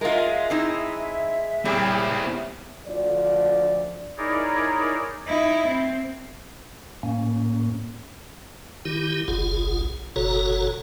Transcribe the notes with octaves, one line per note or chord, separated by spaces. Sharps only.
G#3 F4 A#4 E5
C4 D#4 E4
A#2 C#3 C4 E4 G4
D2 F3 D5
D#4 E4 G#4 A#4 C#5 D5
D#4 E4
C4
A2 A#3 C#4
D#3 E4 G4
F#1 B1 F4 G#4
F#1 B2 F#4 A4 C#5 A#5